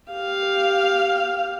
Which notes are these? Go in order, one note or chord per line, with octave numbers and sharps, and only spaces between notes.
G4 F5